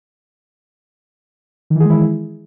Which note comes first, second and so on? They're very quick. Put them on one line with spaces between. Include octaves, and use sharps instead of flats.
D#3 E3 G#4 G#3 E4